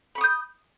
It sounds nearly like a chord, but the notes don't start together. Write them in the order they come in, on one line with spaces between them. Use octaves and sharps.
B5 C#6 D#6 G6